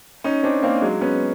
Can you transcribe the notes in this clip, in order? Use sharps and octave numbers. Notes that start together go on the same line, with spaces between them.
C#4 D#4
C4 D4
A#3 C4
F#3 G#3
B3 C#4